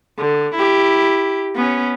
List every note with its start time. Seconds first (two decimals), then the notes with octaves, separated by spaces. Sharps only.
0.18 D3
0.55 E4 G4
1.55 B3 C#4